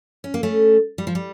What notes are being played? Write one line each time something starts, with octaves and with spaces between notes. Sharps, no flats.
C#4
A#3
A3 C#4
G3
F3
G3